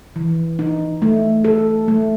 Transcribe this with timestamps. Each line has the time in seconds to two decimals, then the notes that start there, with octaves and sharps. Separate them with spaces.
0.16 E3
0.59 D#4
1.02 A3
1.44 A4
1.88 A3